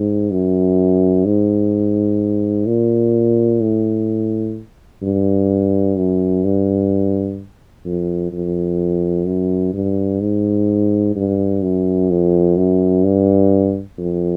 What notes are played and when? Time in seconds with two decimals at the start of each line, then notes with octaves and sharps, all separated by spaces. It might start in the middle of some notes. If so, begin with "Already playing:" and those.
Already playing: G#2
0.31 F#2
1.25 G#2
2.67 A#2
3.62 A2
5.03 G2
5.97 F#2
6.44 G2
7.85 F2
8.32 F2
9.27 F#2
9.74 G2
10.21 G#2
11.16 G2
11.63 F#2
12.10 F2
12.57 F#2
13.04 G2
13.98 F2